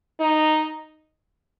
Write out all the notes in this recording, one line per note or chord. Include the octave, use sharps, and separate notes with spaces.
D#4